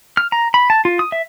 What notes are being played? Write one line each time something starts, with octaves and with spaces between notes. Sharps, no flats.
F6
A#5
B5
A5
F4
D#6
E5